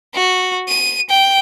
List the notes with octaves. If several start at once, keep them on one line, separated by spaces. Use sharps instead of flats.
F#4
D#7
G5